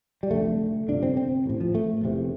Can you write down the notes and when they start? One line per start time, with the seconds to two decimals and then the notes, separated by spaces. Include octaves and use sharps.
0.23 G3
0.30 F1 F2 D3 A3
0.88 G1 F2 C3 D4
1.03 C4
1.17 C4
1.46 A1 A2
1.61 F3
1.75 A3
2.03 F1 E2 C3